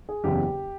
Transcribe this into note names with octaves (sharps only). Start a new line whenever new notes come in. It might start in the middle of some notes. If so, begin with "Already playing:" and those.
G#4
F#1 E2 C#3 G4